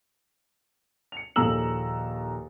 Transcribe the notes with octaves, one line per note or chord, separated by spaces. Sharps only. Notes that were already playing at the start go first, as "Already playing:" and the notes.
C#7 F7
A#1 D#2 A4 A#5 E6 F#7